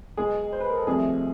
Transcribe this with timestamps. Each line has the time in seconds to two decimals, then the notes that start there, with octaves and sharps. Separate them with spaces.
0.17 B1 B2 G#3 G#4
0.53 C5
0.60 B4
0.70 A#4
0.78 A4
0.87 C2 C3 F3 A3 G#4